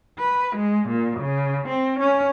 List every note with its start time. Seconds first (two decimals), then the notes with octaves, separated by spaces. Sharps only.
0.19 B4
0.56 G#3
0.89 A#2
1.20 C#3
1.68 C4
2.00 C#4